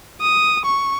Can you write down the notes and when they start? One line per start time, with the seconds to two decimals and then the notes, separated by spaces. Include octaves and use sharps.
0.21 D#6
0.65 C#6